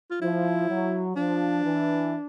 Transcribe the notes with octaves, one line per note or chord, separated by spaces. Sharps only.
F4
F3 E4
F#3
F3 D4
E3